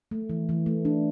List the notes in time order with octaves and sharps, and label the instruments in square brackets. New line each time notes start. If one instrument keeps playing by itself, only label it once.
[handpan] A3
E3
E3
A3
D4